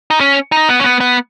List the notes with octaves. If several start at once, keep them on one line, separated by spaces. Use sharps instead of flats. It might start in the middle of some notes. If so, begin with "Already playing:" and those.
D#4
C#4
D#4
B3
C#4
B3
B3